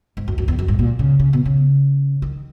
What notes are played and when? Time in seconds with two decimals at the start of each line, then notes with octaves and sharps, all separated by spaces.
0.17 G#2
0.28 F#2
0.38 F#2
0.48 E2
0.59 F#2
0.68 G#2
0.79 A#2
0.99 C#3
1.19 C#3
1.33 B2
1.45 C#3
2.22 D#3